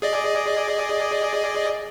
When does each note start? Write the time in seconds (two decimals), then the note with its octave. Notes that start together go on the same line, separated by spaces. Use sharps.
0.02 G#4 D5 D#5